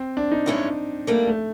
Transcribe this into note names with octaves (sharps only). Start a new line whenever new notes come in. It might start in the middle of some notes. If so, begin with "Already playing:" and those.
Already playing: C4
D4
D#4
G2 E3 G#3 C#4
G3 A3 A#3 D4
A3